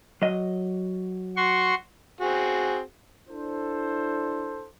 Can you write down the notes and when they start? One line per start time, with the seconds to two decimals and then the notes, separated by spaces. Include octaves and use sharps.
0.22 F#3 D#5
1.37 F#4 C6 C#6
2.21 C4 F#4 G#4
3.29 D4 E4 A4 C5